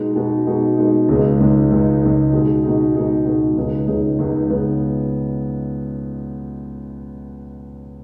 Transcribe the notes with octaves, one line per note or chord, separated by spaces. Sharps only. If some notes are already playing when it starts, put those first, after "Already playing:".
Already playing: B2 G#3 D#4
B2 G#3 D#4
B2 G#3 D#4
B2 G#3 D#4
C#2 C#3 G#3 D#4
C#2 C#3 G#3 D#4
C#2 C#3 G#3 D#4
C#2 C#3 G#3 D#4
B2 G#3 D#4 G#4
B2 G#3 D#4 G#4
B2 G#3 D#4 G#4
B2 G#3 D#4 G#4
C#2 C#3 B3 D#4 G#4
C#2 C#3 B3 D#4 G#4
C#2 C#3 B3 D#4 G#4
C#2 C#3 B3 D#4 G#4